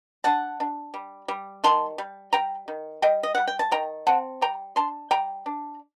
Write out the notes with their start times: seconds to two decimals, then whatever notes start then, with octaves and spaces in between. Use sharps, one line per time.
0.24 D4 F#5 A5
0.60 D4
0.94 G3
1.28 G3
1.64 D#3 A5 C6
1.98 G3
2.33 G3 G5 A#5
2.68 D#3
3.02 G3 D#5 G5
3.23 D#5
3.35 G3 F#5
3.47 G5
3.59 A5
3.71 D#3 G5 A#5
4.07 C4 F#5 A5
4.41 G3 G5 A#5
4.76 D4 A5 C6
5.11 G3 G5 A#5
5.46 D4